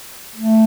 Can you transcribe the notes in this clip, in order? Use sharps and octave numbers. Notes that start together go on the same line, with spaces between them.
A3